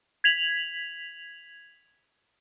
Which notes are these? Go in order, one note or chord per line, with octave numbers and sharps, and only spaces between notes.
G#6 B6 F7 F#7